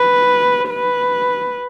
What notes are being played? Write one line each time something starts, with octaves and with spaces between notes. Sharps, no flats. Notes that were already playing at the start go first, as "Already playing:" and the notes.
Already playing: B4
B4